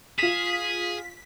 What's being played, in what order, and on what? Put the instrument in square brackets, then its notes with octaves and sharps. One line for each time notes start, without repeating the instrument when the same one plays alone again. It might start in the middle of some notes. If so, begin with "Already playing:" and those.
[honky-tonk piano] F4 E7 [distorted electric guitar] G#4 [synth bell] B6